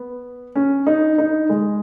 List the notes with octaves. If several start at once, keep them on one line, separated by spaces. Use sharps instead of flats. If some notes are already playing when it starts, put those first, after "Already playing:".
Already playing: B3
C#4
D#4
D#4
G#3